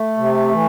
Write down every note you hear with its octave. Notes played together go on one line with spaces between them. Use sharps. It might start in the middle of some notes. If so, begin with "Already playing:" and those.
Already playing: A3
C3
E3